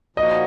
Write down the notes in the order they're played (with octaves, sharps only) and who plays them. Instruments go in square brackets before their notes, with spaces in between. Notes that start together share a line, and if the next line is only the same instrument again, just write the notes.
[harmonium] A#2 F3 A#3 D#4 F#4 [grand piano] D#5